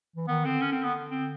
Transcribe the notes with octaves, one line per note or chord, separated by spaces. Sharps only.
E3
D#3 B3
D3 C4
C#4
C4
B3
C4